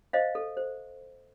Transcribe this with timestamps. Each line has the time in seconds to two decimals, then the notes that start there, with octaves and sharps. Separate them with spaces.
0.13 C5 D#5 F5
0.35 A4
0.57 C5